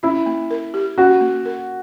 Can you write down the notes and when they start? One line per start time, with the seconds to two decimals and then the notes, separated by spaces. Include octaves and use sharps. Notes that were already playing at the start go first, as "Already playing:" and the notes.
0.03 C#4 E4
0.26 A#3
0.51 A#4
0.74 G4
0.98 C#4 F#4
1.21 A#3
1.45 A#4